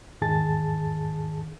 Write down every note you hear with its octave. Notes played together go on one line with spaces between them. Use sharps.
E2 G#2 D#3 G#4 A5 A6